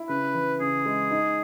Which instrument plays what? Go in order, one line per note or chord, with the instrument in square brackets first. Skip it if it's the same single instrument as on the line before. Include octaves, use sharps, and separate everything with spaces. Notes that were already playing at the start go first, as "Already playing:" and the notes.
Already playing: [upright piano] E4
[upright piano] C#3 [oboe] B4
[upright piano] E3
[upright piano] C#3 [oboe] G#4
[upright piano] G#3
D#4